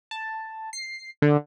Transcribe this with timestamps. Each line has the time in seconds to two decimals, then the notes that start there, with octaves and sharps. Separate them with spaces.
0.11 A5
0.73 C7
1.22 D3